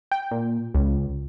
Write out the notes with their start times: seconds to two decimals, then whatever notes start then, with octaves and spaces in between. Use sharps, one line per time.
0.12 G5
0.31 A#2
0.74 C#2